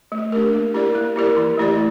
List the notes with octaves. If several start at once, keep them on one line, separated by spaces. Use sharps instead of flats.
A3
D4 G4 A#4
A#3
E4 G4 A#4 D5
A#3
E4 G4 A#4 D5
E3
A3 E4 G4 D5